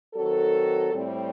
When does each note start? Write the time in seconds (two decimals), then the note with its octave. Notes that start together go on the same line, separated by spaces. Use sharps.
0.13 D#3 F#3 C4 F#4 A4
0.92 A2 G3 C4